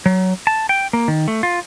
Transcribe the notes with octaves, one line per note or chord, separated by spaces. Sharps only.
F#3
A5
G5
A#3
D#3
A3
F4